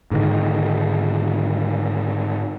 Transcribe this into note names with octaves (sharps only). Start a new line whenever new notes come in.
G#2 D3 D#3